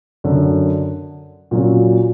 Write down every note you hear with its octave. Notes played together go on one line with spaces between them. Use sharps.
F#2 D3 F#3
A#2 F#3 C#4